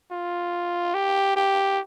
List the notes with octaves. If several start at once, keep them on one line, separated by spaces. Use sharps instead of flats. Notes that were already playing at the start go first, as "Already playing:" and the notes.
F4
G4
G4